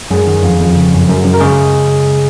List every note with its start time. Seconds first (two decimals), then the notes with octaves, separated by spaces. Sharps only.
0.11 F#2 G#3 G#4
0.27 D#3
0.43 F2
0.60 F2
0.76 C#3
0.92 F#2
1.09 F#2
1.25 F#2
1.34 A#4
1.41 C#3 G#3 G#4